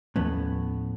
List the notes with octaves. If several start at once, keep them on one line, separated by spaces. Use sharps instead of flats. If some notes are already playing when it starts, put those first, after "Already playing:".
D#2 A2 F3 B3 C#4